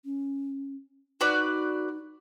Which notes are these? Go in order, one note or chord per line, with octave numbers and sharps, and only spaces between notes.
C#4
D#4 F#4 B4 D5